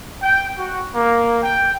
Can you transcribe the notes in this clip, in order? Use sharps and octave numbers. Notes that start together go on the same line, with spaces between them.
G5
F#4
A#3
G5